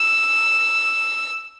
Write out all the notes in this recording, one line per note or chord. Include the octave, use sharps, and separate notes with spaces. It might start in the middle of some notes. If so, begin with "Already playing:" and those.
Already playing: E6